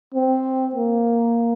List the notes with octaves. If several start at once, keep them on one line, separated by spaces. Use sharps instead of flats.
C4
A#3